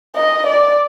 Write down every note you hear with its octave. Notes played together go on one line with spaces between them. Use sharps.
D#5
D5